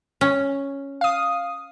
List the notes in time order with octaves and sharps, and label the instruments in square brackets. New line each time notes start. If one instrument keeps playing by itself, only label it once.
[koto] C#4
[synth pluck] F5 D#6